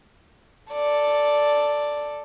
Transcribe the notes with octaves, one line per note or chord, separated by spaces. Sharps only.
A4 D5